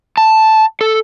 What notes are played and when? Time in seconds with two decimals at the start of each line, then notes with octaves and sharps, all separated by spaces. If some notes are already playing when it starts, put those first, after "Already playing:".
0.17 A5
0.81 A4